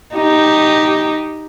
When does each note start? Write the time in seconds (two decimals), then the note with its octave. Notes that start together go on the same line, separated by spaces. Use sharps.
0.16 D#4 G4